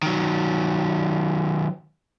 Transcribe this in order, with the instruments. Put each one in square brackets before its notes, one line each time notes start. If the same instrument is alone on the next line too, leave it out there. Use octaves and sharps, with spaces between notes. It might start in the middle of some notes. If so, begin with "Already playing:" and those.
[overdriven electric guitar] D#3 F#3